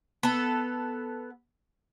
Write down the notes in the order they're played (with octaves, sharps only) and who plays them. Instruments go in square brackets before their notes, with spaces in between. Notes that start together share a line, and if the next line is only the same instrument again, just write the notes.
[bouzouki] B3 A4